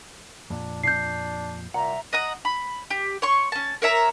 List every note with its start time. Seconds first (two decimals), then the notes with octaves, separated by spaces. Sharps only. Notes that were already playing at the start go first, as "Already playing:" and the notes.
0.50 F2 A#2 D4
0.83 D4 G6 C7
1.74 C2 A#2 E5 F#5 A#5
2.13 D#5 F#5 A#5 D#6
2.45 B5
2.90 G4
3.22 C#5 C6 C#6
3.52 C#4 A5
3.82 A#4 C#5 E5 A#5